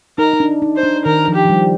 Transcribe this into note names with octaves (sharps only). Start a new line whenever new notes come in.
D#4 A#4
D#4
D4
D#4
C5
D4
D#3 A#4
F3
G4
F3
G3